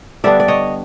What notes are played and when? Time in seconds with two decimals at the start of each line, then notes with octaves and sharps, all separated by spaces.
0.24 D3 G3 B3 D4 D5 E5
0.40 D5
0.48 C#5 D#5